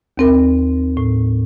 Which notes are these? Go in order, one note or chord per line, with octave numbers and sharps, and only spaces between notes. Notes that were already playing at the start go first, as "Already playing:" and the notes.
D#2 C4 A#4
A2